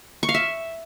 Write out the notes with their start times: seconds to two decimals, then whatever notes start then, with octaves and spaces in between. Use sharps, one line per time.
0.23 C#6
0.29 F5
0.34 E5